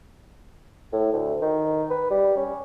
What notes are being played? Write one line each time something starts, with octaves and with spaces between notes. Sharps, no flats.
A2
D2
D#3
B4
G3
C#4